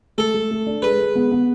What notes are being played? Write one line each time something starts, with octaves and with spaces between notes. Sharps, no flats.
A3 A4
A3
A3
D4
G#3 B4
G#3
B3
B3